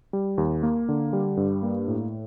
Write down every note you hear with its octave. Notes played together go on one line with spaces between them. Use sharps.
G3
D#2
A#3
D3
G3
G2
A#3
A2